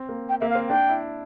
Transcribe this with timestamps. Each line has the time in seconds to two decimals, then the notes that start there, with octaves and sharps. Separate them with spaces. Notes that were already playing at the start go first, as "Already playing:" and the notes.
Already playing: C4
0.09 A#3
0.29 G5
0.41 A#3 E5
0.49 F5
0.55 C4
0.69 D4 G5
0.89 E4